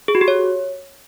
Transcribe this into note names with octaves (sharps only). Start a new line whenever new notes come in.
G#4
F#4
G4
C#5